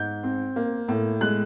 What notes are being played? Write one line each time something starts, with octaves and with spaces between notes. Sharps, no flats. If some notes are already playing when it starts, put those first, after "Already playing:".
Already playing: G#2 G6
C4
A#3
A2
G#3 F#6